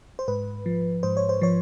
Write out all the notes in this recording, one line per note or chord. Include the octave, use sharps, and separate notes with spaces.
C5
G#2 B4
F3
G#2 C5
C#5
C5
F3 C#5